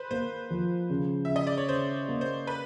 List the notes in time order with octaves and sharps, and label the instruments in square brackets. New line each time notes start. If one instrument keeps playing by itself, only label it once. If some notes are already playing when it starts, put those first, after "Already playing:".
Already playing: [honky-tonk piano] B4 C5
[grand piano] A#3 [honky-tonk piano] C5
[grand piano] F3
C#3
[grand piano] C#3 [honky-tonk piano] E5
[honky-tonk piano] D#5
D5
C#5
[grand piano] C#3 [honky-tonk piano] C5
[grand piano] A#3
[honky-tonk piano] C5
B4